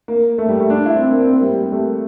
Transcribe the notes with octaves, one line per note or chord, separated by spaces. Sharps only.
A#3
A3
G3
A3
D4
E4
C4
D4
A#3
C4
A#3
G3
G3
G3
A3